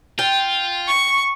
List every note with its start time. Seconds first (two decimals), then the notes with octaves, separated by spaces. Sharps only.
0.19 F4 G5
0.87 C#6